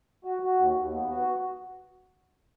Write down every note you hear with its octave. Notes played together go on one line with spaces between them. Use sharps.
F#4
F#4
D#2
D#2
B3
F#4